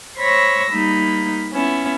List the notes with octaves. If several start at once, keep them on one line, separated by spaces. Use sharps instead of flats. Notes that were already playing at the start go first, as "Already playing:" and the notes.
C5 C#5 B5 C#6 E6 A#6
G3 A#3 D#4 B5
B3 C#4 E4